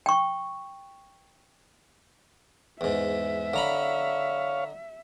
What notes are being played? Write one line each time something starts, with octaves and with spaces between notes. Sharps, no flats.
G5 C#6
E2 G#2 E5
D3 C#5 F5 A#5 B5